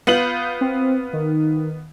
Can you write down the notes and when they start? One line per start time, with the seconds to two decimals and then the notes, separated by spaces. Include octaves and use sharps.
0.07 B3 F4 G6 F#7
0.61 C4
1.13 D#3